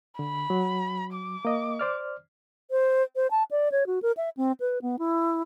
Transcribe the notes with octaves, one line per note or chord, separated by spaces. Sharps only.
D3 B5
F#3
D6
A#3 D#5
C5 D5 F6
C5
C5
A5
D5
C#5
F#4
A#4
E5
C4
B4
B3
E4